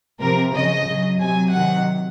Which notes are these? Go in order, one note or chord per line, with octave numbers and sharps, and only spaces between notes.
C3 F3 A#4
C#3 F3 D#5
C#3 F#3
C3 F#3 G#5
C3 D#3 F#3 F#5